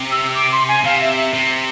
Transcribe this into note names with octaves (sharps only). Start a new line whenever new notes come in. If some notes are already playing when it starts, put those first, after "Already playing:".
Already playing: C3
E6
D6
C6
G#5
C3 F5
E5
E5
C3